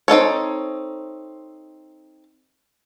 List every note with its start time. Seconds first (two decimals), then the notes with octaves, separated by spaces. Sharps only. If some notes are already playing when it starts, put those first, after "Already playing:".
0.08 C4 D#4 A4 C#5